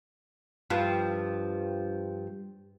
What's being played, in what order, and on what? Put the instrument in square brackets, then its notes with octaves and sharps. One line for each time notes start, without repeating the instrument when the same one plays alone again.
[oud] G2 F3